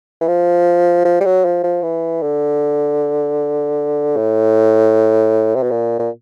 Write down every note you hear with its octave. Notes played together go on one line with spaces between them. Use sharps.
E3
F3
F3
G3
F#3
F3
F3
E3
D3
A2
C3
B2
A#2
A#2